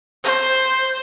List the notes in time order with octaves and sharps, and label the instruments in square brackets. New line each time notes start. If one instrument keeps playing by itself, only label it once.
[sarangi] C5